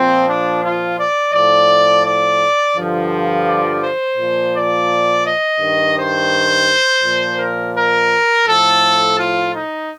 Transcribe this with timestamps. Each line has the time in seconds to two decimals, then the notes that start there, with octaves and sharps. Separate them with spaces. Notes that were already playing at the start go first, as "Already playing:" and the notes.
Already playing: A#2 F3 C4
0.26 D4
0.61 F4
0.97 D5
1.32 A2 F3 D5
2.04 D5
2.75 G2 D3 F3
3.47 D5
3.82 C5
4.17 A#2 F3
4.54 D5
5.25 D#5
5.60 G2 D#3
5.96 C5
7.03 A#2 F3
7.38 A#4
7.75 A#4
8.46 A2 F3 A4
9.17 F4
9.53 D#4